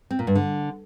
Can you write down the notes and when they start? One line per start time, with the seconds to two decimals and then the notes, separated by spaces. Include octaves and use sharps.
0.11 C4
0.19 A#2
0.27 G2
0.35 D3